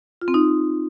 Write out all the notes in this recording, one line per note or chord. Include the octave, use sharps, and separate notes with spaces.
F4
C4
D#4